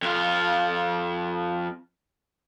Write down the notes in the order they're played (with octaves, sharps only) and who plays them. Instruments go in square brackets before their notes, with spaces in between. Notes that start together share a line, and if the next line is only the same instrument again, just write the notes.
[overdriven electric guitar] F2 F4